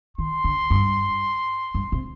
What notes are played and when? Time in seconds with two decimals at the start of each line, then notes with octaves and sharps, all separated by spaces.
0.18 D#3 C6
0.44 D3
0.70 G2
1.75 G2
1.92 C3